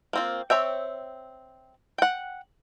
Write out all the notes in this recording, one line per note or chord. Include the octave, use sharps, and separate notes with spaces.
A#3 C4 F4
C4 C#5 E5 G5
F#5 G5